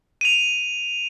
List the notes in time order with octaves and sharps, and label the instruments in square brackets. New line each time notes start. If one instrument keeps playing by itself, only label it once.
[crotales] D#7 F7